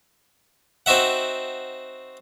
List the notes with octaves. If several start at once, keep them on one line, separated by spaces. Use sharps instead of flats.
C4 D#4 F#4 E5 F#5